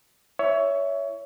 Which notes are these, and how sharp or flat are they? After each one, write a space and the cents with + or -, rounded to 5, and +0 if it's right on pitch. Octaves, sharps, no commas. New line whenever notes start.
E4 +5 C#5 +20 E5 +0